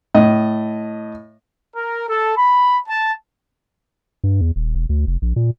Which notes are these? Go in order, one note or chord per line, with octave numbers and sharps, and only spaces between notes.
A2 D#5
A#4
A4
B5
A5
G2
E2
D#1
E1
D2
F1
A#1
A#2